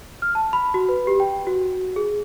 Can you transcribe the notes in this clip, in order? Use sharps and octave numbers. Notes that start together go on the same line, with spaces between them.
F6
A5
B5
F#4
B4
G4
G5
F#4
G#4